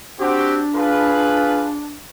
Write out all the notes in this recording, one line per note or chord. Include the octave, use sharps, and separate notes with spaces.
C4 D4 F#4 G4
F4 G#4 B4